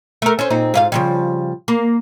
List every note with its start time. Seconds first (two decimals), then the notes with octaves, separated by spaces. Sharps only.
0.22 A3 A#4
0.39 C#4 C5
0.50 A#2 C4 D#4
0.74 G#2 F4 F5
0.92 C#3 F3 G3
1.68 A#3